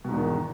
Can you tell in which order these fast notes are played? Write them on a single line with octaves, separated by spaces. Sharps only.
B2 G#2 E2 D#3